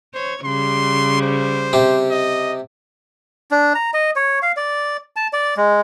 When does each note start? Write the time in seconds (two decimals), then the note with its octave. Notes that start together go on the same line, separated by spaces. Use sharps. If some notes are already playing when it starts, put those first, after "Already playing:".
0.14 C5 C#5
0.44 C#3 G3 C6
1.22 C5
1.73 C3 G4
2.10 D#5
3.51 D4
3.75 A#5
3.94 D#5
4.16 C#5
4.42 F5
4.57 D5
5.16 A5
5.33 D5
5.57 G#3